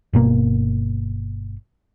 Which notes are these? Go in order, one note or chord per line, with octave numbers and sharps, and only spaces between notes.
G1 B2 A#3